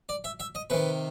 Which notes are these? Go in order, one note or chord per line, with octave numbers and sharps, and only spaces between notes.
D5
E5
E5
D#5
C3 D#3 B4